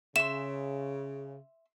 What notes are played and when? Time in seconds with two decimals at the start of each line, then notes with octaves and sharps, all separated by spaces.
0.16 C#3 E5 C6 E7